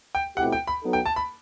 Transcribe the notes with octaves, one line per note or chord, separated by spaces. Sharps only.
G5
B2 A3 C4 E4 G4 F#5
G5
B5
F#3 B3 D#4 A4
G5
A5
B5